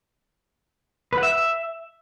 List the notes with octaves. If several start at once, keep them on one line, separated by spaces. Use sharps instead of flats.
B4
F#5
E5